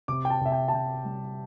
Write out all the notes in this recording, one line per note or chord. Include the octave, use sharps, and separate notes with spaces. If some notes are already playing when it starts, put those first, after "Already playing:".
C3 D6
G5
A5
C3 E5
G5
A5
C3 G5
G3